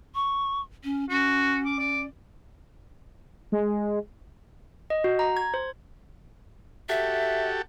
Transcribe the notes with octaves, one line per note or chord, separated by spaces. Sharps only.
C#6
C#4
C#4 F#4
D6
D5
G#3
D#5
F#4
A#5
G#6
C5
F#4 G4 A4 E5